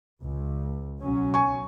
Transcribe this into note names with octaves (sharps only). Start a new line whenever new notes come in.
C#2
B1 F#3 C#4
G#5 C#6